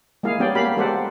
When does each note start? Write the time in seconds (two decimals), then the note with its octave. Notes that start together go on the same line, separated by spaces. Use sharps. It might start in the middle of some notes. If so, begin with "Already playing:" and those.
0.23 G#3 A#3 E4 G#4 F5
0.39 G3 B3 C#4 D5 G5
0.55 A#3 G4 F5 B5
0.77 G#3 G4 A4 C5 D5 F#5